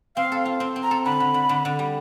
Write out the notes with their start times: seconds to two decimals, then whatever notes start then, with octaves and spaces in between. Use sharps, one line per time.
0.16 C4 F5
0.32 A4
0.45 F4
0.60 C4
0.76 C4
0.83 A#5
0.91 A4
1.05 D3 B5
1.20 D3
1.34 D3
1.49 D3
1.65 D3
1.79 G3